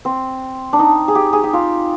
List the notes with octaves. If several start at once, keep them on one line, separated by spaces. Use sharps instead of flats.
C4
D4
D#4
G#4
G4
G#4
G4
F4